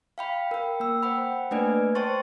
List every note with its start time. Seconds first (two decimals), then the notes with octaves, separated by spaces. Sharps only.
0.18 F5 G5 B5
0.51 A#4 G5
0.80 A#3 E6
1.03 C5 F#5 G5 B5
1.51 A3 A#3 D4 B4 D5 G#5
1.95 C5 G5 A5 C6 C#6 A6